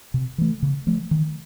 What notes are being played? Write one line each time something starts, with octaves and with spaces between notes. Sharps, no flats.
C3
E3 A3
C#3
F3 A3
D#3